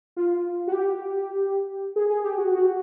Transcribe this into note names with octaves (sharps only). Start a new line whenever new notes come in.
F4
F#4
G4
G#4
G#4
G4
F#4
F#4